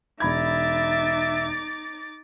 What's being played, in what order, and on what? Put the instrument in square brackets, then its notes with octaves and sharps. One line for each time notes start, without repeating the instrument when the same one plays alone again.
[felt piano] E1 B5 G#6 [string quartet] D#4 D6 A6 [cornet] E5